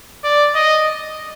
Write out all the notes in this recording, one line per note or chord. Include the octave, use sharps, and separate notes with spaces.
D5
D#5